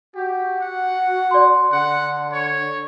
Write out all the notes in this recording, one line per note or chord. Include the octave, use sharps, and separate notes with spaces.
F#4 G4
F#5
D5 C6
D3 F#5
C#5